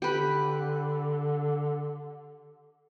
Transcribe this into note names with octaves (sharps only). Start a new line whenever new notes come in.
D3 G4 B4